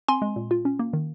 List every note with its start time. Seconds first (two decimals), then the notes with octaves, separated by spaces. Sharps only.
0.08 C4 G#5 C6
0.22 G#3
0.36 A#2
0.51 F4
0.65 C#4
0.79 A#3
0.93 D#3